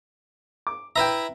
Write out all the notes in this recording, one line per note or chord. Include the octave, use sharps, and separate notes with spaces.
D6
E4 B4 E5 G5 A#5